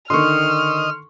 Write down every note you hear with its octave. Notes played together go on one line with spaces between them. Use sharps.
D3 D#3 D#5 C6 C#6 F6